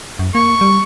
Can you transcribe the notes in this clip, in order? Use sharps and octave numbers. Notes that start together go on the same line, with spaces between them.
F#2
A#3 C#6
G3